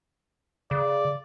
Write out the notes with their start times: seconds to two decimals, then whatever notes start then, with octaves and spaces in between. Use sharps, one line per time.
0.71 C#3 D5